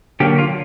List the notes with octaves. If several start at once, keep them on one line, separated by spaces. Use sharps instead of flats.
D3 F#3 A#3 G4
F4